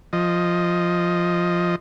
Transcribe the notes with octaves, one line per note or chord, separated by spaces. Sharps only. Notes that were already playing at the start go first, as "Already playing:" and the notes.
F3 D#5